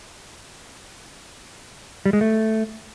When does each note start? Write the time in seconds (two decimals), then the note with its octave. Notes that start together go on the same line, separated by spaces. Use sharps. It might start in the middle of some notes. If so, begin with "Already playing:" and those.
2.06 G3
2.13 G#3
2.21 A3